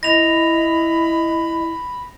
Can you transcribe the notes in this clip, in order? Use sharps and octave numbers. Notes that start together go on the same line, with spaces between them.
E4 D#5 B5 A#6 F7